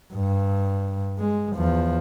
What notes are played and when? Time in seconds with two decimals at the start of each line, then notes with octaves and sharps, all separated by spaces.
0.14 G2
1.18 G#3
1.55 E2 F3